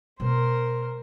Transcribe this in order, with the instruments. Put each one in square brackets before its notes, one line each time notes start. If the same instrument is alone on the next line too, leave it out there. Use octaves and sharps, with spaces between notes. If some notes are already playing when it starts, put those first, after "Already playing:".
[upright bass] B2 G#3 [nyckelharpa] A#4 C5